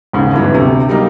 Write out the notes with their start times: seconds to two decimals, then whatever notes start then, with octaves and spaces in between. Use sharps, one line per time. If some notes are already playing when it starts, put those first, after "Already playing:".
0.13 D#2 G#2 C#3
0.33 G1 G2 E3 F#3
0.54 D2 C3
0.89 F#3 G3 A#3 D#4